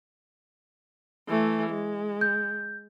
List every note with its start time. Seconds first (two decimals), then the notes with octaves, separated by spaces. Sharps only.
1.28 E3 A3
1.70 G#3
2.21 G6